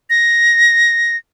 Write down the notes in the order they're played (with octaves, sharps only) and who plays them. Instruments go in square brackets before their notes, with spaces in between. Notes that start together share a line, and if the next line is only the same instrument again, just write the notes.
[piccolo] A#6